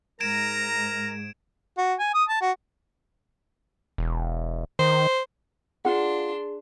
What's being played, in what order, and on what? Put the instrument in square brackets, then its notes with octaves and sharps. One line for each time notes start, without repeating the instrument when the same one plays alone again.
[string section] G#2 [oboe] A#4 [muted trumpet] A#5 [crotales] G#6 D7 E7
[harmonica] F#4
G#5
D#6
A5
F#4
[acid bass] E1
[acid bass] D#3 [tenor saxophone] C5
[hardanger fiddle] D4 C6 [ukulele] F4 F#5 [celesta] G#4